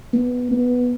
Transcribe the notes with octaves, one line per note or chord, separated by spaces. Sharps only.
B3
B3